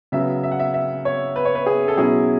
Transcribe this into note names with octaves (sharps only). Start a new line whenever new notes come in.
C#3 F#3 B3 E5
E5
F#5
E5
E5
C#5
B4
C#5
B4
G#4
A4
B2 F#3 C#4 E4 G#4